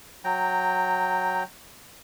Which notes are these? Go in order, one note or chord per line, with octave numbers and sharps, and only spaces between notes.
F#3 G5 A#5